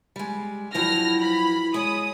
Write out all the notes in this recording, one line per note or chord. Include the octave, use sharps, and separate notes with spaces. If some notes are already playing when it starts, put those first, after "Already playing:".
G3 G#3
G2 F3 F#3 E4 F6 A#6
B5
G#3 C#5 D#6